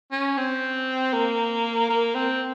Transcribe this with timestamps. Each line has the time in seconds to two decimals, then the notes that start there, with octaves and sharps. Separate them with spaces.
0.12 C#4
0.37 C4
1.13 A#3
1.90 A#3
2.15 C4